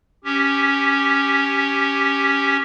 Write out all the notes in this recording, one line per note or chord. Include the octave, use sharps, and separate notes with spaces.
C#4 G4